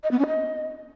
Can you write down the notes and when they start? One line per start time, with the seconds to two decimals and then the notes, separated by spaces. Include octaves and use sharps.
0.03 D#5
0.11 B3
0.19 C#4
0.27 D#5